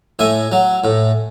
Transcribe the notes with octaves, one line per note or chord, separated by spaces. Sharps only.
A2 E5 G#5
F#3
A2